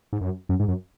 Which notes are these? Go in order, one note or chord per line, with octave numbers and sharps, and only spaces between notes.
G#2
F#2
F#2
G#2
F#2